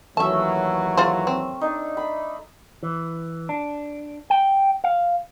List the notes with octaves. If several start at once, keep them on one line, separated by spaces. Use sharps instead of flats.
D#2 E3 F#3 A3 C#4 E5 A5 E6
F4 G#4 C5
C4
D4 D#4
B5
E3
D4
G5
F5